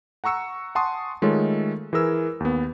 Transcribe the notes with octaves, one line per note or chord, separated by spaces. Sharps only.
F#5 A#5 C#6 E6 C#7
F#5 G#5 A5 C6 C#6 D#6
D#3 G#3 A3 F4 A4 C#5
E3 G#4 A#4 E6
D#2 B3